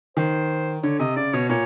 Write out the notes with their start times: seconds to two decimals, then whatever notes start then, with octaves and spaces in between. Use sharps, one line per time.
0.17 D#3 C5
0.83 D3 C#5
1.00 C3 D#5
1.16 C#3 D5
1.33 B2 C#5
1.49 A#2 C#5